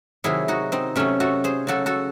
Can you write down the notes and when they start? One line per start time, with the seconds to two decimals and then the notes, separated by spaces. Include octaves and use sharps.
0.24 C3 D#3 F#3 E4 G#4
0.48 D#4 F#4
0.72 C4 D#4
0.96 C3 F#3 A3 C#4
1.20 F#4 A4
1.44 G#4 C5
1.67 C#3 F#3 F#4 A4
1.86 F#4 A4